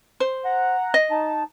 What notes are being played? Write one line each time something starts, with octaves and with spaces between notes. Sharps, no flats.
C5
F#5 A#5
D#5
D#4 A5